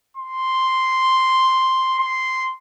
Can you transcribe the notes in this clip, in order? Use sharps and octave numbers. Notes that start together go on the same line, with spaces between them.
C6
C6